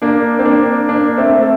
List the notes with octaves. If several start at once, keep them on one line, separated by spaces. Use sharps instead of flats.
A#3 D4
C4
A#3 D4
A#3 D4
A3 C4
A3